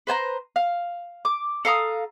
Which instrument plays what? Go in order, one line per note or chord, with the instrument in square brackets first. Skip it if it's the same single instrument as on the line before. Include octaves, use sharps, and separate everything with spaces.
[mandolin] B4 C5 G#5 A#5
F5
D6
A4 F5 A#5 D#6